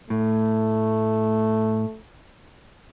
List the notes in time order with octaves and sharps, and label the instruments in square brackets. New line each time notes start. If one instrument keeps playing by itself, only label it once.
[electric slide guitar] A2 [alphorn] A3